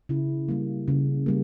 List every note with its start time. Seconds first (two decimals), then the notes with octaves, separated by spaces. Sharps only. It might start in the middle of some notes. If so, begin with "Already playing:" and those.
0.09 C#3 E4
0.48 G3 A#3
0.88 C#3
1.26 G3 A#3